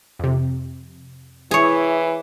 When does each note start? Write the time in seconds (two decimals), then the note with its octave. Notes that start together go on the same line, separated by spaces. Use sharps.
0.19 F2 C3
1.51 E3 E4 G#4 C#5